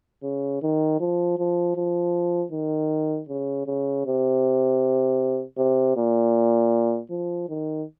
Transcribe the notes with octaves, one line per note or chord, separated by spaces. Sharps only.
C#3
D#3
F3
F3
F3
D#3
C#3
C#3
C3
C3
A#2
F3
D#3